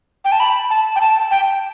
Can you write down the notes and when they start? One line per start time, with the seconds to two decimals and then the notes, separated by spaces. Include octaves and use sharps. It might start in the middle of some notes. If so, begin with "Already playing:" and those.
0.25 G5
0.32 A5
0.40 B5
0.70 A5
0.96 G5
1.01 A5
1.31 G5